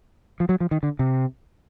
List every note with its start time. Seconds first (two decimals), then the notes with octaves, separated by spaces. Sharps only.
0.40 F3
0.49 F#3
0.60 F3
0.71 D#3
0.83 D3
0.99 C3